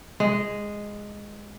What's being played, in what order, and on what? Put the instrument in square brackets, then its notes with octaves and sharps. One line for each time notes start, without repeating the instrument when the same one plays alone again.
[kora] G#3